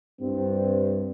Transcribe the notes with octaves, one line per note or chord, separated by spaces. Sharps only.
C2 G2 C4